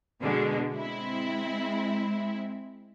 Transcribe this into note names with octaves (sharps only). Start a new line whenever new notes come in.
B2 D3 G#3
G#3 C4 E4